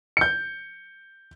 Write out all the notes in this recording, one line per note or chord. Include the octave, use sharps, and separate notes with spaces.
G6 C#7